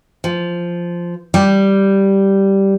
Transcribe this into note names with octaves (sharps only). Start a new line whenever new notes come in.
F3
G3